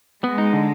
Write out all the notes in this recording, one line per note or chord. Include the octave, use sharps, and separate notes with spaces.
G#3 B3
D#4
D3